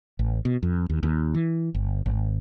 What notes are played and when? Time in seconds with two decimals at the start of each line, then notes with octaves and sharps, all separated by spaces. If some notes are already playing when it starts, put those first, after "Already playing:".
0.19 A1
0.45 B2
0.63 F2
0.90 D#2
1.03 D#2
1.34 E3
1.75 G1
2.06 G#1